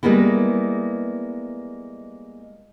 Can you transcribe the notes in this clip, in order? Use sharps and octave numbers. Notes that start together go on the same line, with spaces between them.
G3 G#3 A#3 B3 E4